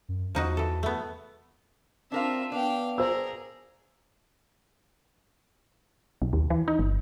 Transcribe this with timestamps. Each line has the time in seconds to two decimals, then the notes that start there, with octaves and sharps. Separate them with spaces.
0.09 F#2
0.35 E2 F3 D#4 F#4
0.57 E3 A4
0.83 A3 B3
2.12 C4 D4 F4 A#4 E5 F5
2.52 B3 D4 F5 G5
2.98 G#4 A#4 C5 E6
6.22 B1
6.33 D#2
6.50 E3
6.68 D#4
6.79 G1